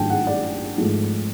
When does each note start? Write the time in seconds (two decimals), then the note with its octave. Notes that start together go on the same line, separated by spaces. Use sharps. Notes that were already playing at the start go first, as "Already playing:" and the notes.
Already playing: G#1 G2 D#3 F#3 A3 G5 A5
0.10 F#5
0.27 D5
0.78 G#1 G#2 F3 A3